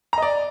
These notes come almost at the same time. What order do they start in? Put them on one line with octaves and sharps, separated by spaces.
A#5 D#5 D5